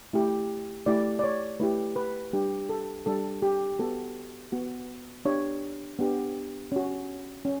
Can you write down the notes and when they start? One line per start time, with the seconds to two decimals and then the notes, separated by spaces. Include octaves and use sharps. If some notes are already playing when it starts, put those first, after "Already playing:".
0.13 A3 E4 G4
0.86 A3 E4 G4 D5
1.19 D5
1.24 C#5
1.60 A3 E4 G4 B4
1.96 B4
2.33 G3 D4 G4
2.69 A4
3.06 G3 D4 G4 A4
3.42 G4
3.79 B3 F#4 A4
4.52 B3 F#4
5.25 B3 D4 G4 C#5
5.99 B3 D4 G4
6.72 C#4 F#4
7.45 C#4